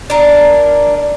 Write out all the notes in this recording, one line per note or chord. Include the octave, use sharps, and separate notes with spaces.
D4 A#4